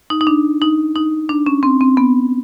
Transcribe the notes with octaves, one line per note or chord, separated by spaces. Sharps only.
D#4
D#4
D4
D#4
D#4
D4
C#4
C4
C4
B3